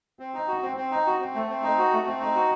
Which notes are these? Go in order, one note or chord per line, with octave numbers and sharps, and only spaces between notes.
C4
D#4
F#4
C4
C4
D#4
F#4
C4
A3
C4
D#4
F#4
A3
C4
D#4
F#4